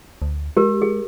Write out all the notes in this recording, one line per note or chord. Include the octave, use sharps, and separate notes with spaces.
D2
G#3 G4 A#4
G#4